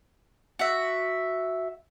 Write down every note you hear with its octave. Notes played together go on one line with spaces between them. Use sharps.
F#4 E5